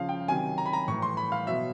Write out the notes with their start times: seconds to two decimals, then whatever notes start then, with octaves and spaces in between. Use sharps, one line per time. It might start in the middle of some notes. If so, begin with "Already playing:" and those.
Already playing: C#3 F3 F5
0.09 G5
0.28 C3 D#3 F#3 G#5
0.58 A#5
0.66 B5
0.73 A#5
0.88 A2 E3 C#6
1.02 C6
1.17 B5
1.32 F5
1.46 B2 F#3 E5